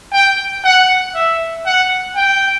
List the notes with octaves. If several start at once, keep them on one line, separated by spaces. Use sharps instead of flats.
G5
F#5
E5
F#5
G5